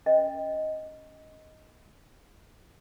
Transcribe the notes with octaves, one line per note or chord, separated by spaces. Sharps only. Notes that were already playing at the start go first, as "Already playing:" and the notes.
C#4 D#5